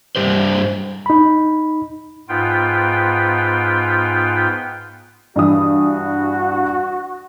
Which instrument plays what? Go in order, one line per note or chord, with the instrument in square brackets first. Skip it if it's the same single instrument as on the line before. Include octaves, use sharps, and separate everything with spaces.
[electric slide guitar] G2 G3 G4 C5
[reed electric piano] D#4 B5
[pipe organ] G#2 B3 F4 G5
[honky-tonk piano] G2 E3 D#6 [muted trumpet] F#4